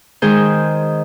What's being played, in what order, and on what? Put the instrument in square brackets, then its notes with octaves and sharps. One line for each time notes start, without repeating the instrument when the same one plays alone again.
[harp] D#3 G#3 G#4 C5 G6